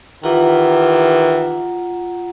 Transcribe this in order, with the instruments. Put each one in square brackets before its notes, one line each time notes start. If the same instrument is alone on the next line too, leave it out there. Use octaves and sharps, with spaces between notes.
[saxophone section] D#3 E3 G4 [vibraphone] F4 F#5 A#5